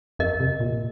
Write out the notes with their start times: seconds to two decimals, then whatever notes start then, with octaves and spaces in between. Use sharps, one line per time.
0.19 F2 A#4 D#5
0.40 C3
0.60 A#2